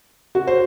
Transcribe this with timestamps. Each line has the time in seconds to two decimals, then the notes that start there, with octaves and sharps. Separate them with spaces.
0.35 F#4
0.47 C5